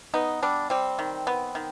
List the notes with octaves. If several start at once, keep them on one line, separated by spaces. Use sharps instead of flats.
B3 D#4
G3 D4
G3 C4
D#3
B3
D#3